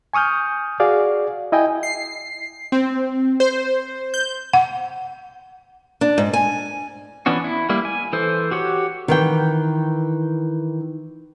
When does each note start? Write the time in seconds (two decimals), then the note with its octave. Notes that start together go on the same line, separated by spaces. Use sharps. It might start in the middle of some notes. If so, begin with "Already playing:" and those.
0.14 G#5 C#6 D#6 F6 G6
0.80 F#4 G#4 D5 F5
1.52 E4 D#5 G5 G#5
1.83 C7
2.72 C4
3.40 C5
4.14 G6
4.53 F#5
6.01 D4
6.18 G#2
6.33 G#5
7.26 E3 B3 C#4 D4 F#4
7.44 E4
7.69 G3 A#3 E4
7.85 G#5
8.13 E3 A4 C5
8.51 F#4 G4 C#5
9.08 D#3 E3 G5